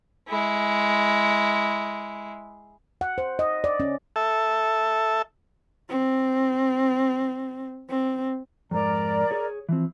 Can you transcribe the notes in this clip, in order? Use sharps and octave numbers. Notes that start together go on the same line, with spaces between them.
G#3 E4
F#5
C5
D#5
D5
C#4
A4 E5
C4
C4
F2 G#2 A#4 D5 A#5
G#4 C#5
E3 F3 C4